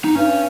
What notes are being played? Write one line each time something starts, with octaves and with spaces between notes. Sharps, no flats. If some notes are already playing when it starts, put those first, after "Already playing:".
D#4
G2 C#4